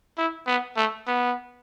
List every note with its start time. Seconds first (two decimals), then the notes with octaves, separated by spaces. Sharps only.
0.18 E4
0.47 B3
0.77 A3
1.07 B3